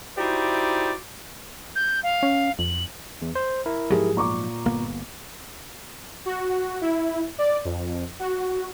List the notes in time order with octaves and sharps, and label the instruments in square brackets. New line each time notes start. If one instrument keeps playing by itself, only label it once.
[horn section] D#4 E4 F#4 G4 C5 D5
[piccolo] G6
F5
[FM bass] C#4
[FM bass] F2 [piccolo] F#7
[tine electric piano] E2
C5
E4 A#4
[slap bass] G#2 F3 F#3 [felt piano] G4 G#4
[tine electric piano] A#2 [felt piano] A#5 C#6 D6
[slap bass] G1 A#3 B3
[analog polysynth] F#4
E4
D5
F2
F#4